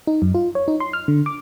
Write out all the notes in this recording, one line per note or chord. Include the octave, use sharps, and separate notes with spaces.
D#4
F#2
F4
C#5
D#4
C6
F6
D3
D6